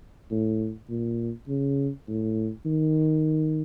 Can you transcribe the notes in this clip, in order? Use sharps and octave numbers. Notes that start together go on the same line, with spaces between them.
A2
A#2
C#3
A2
D#3